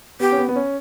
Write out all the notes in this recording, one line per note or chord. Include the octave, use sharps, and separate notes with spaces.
B3 G4
C#4
B3
B3
C#4